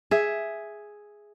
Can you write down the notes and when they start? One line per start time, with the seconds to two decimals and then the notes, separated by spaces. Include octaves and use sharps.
0.11 G#4 E5